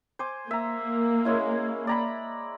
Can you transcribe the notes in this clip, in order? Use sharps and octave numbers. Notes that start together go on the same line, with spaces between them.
C5 G#5 D6
A#3 E5 A#5
G#3 C#4 E4
D5 A#5 B5